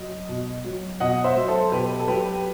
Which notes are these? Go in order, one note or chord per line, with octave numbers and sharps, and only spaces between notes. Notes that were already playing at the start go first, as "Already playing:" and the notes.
Already playing: F#3 D#5
B2
F#3
B2 D#5 F#5
C5 E5
F#3
A4 C5
B2 G4 B4
A4
F#3 G4 B4